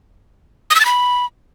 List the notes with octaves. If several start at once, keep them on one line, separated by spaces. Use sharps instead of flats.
D#6
E6
A6
B5